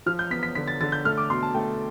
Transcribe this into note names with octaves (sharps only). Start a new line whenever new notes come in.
F3 F6
G6
B3 B6
B6
D3 B6
A6
D3 A6
G6
A3 F6
D6
B2 C6
A5
A3 G5